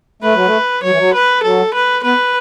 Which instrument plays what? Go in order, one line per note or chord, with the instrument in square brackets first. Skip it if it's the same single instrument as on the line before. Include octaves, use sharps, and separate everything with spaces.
[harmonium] A3 [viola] B4
[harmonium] F#3
A3
[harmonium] F#3 [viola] C#5
[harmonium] E3
F#3
[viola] B4
[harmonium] F#3 [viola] A4
[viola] B4
[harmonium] B3 [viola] B4